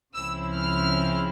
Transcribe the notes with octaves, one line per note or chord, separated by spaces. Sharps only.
C#2 C#3 F3 C4 E4 E6
F6